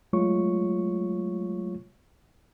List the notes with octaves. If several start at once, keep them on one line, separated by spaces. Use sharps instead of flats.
F#3 G#3 A3 F4 C#5 C#6